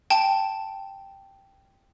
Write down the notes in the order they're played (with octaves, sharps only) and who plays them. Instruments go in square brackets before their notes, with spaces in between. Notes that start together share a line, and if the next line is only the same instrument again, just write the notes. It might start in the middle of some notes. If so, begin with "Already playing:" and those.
[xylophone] G5 A5